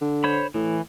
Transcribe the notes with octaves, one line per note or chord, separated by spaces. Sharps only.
D3
C5 C#5 B5
A2 E3